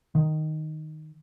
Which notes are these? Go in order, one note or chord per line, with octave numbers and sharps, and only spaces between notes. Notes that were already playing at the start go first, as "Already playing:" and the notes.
D#3